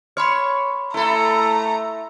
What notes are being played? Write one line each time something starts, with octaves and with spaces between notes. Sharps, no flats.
C#5 B5 C6 F6
A3 E4 A4 A#5